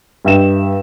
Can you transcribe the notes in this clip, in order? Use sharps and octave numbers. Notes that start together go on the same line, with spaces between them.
G2 D#5 E5 G5 E7